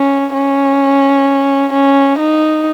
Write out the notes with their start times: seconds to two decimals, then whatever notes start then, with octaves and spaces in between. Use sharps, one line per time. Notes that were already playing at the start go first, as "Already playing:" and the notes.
Already playing: C#4
0.35 C#4
1.73 C#4
2.19 D#4